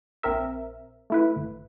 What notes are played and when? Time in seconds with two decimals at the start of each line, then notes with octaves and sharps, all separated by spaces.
0.23 A#1 C4 A#4 E5
1.10 A3 E4 B4
1.36 G1